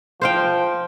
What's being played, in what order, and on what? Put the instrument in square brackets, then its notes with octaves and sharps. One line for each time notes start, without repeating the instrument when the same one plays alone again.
[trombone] F3 [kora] C5 F5 G5